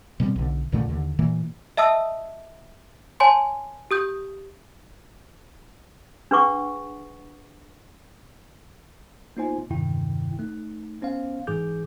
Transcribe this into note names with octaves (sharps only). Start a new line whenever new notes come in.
B2 G3 A3 C4
B1 D3
C#2 A#2 D3 A3
D#2 D3
A#2 E3 A#3
D#5 E5 A5 D#6 E6
C#5 G#5 A5 C6
G4 D#6 G6
D4 G#4 B4 F#5 C#6 D6
A#3 B3 D#4 F4 C5 G#5
E2 G2 C3 D#3 E4 G5
A3 D#4
B3 C#4 C5 F5
G#2 E3 G#4 D6 G6